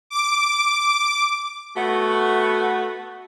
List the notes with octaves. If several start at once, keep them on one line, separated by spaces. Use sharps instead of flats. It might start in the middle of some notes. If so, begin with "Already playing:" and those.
D6
A3 B3 F#4